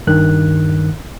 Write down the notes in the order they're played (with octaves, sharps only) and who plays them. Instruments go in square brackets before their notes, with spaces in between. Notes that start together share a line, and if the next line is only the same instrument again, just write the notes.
[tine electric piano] G2 D#3 F#6